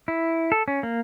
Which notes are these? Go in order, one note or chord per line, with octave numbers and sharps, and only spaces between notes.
E4
A4
C#4
A#3